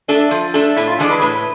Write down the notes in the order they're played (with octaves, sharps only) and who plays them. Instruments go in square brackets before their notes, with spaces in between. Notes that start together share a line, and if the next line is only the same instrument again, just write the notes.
[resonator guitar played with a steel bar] A3 D4 A4
F3
A3 D4 A4
[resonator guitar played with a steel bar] A2 [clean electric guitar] E4
[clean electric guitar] F4
[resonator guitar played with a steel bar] E3 G#3 D4 [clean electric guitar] A4
[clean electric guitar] B4
[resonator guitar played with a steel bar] A2 [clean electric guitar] B4